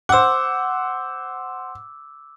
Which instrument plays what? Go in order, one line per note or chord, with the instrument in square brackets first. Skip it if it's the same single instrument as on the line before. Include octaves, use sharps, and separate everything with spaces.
[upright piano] C5 F#5 [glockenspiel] D6 E6